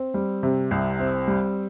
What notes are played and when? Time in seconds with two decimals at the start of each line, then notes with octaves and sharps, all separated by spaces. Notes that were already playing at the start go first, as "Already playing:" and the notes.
Already playing: C4
0.14 G3
0.43 C3
0.71 C2
1.00 C4
1.28 G3